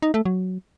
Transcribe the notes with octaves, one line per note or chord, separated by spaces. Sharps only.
D#4
A3
F#3